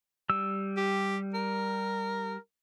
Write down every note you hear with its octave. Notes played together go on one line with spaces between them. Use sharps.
G3 E6
G4
A#4